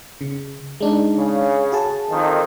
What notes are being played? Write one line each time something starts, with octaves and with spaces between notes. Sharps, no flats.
C#3
G#3 D4 D#4
C#3
F#4 G#4 A5
F2 D#3